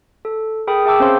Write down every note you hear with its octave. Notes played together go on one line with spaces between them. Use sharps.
A4
G#4 A#4 G5 B5 D#6
G#4 E5 G5 A5 D6 E6
C4 C#4 C5 C#5 F5 C6